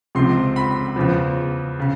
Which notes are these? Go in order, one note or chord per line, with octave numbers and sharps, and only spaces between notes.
C#2 C3 F3 C6
B5
E2 C#3 F3
C#3